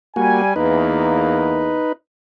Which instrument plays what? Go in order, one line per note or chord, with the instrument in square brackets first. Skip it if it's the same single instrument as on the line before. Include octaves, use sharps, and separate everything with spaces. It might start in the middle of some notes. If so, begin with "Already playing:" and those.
[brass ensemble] G3 G#5 [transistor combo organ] A#3 F#4
[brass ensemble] E2 A#3 [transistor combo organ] D#4 B4